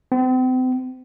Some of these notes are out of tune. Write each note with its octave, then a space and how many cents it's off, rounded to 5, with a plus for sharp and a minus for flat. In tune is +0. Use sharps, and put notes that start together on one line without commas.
C4 -40